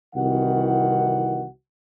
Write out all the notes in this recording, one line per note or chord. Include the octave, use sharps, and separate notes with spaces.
C2 C3 D#3 E3 F#4 F#5